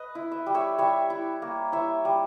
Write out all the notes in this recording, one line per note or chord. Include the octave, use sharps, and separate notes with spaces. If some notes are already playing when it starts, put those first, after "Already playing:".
Already playing: B4 D#5
E4
E5
G3
C#5 E5
G3 C#5 E5
E4
A#3
E4 C#5 E5
G3